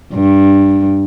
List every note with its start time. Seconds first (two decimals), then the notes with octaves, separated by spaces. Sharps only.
0.13 G2